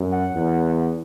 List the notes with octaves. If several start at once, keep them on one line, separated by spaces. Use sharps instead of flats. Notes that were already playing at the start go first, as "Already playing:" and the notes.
Already playing: F#2
F#5
E2